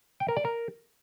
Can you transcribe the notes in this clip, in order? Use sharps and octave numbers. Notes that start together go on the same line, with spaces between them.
G5
A#4
D5
A#4